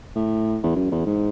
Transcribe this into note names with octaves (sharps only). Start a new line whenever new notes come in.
A2
E2
F#2
E2
G#2